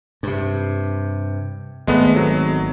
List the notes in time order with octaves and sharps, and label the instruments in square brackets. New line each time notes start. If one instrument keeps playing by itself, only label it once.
[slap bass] G2 C3
[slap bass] G#1 [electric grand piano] G#3 A3 B3
[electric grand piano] F#3